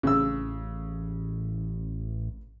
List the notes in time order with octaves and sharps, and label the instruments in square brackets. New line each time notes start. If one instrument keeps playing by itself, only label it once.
[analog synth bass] A1 [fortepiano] C#3 E6